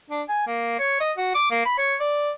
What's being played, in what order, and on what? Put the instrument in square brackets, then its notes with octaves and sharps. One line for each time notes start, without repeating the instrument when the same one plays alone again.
[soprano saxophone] D4
G#5
A#3
C#5
D#5
F#4
D6
A#3
B5
C#5
D5